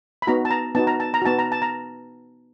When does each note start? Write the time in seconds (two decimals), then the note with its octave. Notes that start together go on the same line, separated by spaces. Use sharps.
0.22 B5
0.27 B3 D#4 F#4 A#5
0.45 A5
0.51 A#5
0.75 B3 D#4 F#4 A5
0.87 A#5
1.00 A5
1.14 A#5
1.22 B3 D#4 F#4 A5
1.39 A#5
1.52 A5
1.62 A#5